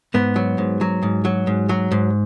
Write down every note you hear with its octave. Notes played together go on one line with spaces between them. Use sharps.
G#2 B3
F#3
G#2
F#3
G#2
F#3
G#2
F#3
G#2